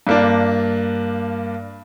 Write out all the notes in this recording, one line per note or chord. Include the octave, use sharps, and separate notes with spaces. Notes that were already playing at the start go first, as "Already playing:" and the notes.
G2 A#3 D4